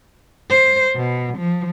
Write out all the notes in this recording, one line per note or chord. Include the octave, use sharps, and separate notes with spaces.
C5
B2
F3